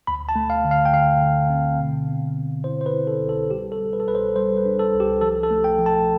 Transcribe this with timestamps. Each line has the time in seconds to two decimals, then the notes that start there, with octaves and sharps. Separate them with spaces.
0.07 D2 B5
0.29 A5
0.36 A3
0.50 F5
0.65 D3
0.71 F5
0.85 G5
0.93 D3 F5
1.22 D3
1.50 C4
1.78 B2
2.08 B3
2.36 B3
2.64 E4 C5
2.81 C5
2.86 B4
2.94 E4
3.07 A4
3.22 C2
3.29 A4
3.51 G3 G4
3.72 A4
3.80 G3
3.93 B4
4.00 A4
4.08 C2 B4
4.15 C5
4.36 G3 C5
4.57 B4
4.65 D4
4.79 A4
4.94 C2
5.00 G4
5.21 F3 A4
5.43 A4
5.51 A3
5.64 G5
5.79 F3
5.86 A5